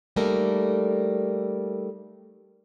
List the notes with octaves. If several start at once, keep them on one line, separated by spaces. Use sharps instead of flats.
G3 A3 A#3 D#4 A4 A#4